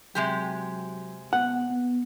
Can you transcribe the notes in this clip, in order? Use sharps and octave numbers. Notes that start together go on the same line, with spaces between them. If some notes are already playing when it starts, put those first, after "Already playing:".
C3 F#3 G#3 G4
B3 F#5
B3